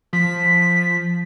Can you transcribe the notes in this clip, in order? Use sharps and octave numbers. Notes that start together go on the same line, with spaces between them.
F3 B6